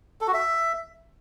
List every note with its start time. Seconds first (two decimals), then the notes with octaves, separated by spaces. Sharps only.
0.21 A4
0.27 F#4
0.34 E5